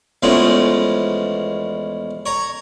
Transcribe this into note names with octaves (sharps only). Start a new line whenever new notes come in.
E2 F3 G#3 A3 C#4
C#5 A#5